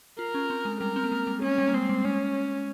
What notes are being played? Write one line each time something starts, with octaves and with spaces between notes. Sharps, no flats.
F4 A#4
C#4
C4
G#3
G3 A#4
C4
A#3
G#3
G3
G#3 C#4
G3
A#3
G#3 C4
G3
G#3 C#4